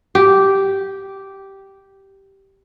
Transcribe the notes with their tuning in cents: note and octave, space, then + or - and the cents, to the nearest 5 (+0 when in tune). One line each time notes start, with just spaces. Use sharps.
G4 -10